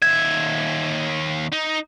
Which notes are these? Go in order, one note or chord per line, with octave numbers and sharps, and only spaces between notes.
D#2 E5 G#6
D#4